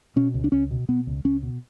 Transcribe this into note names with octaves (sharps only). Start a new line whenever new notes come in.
B2 C#4
C#2
D4
C#2 C#4
B2
B2 B3
C#2
C#2 C#4
B2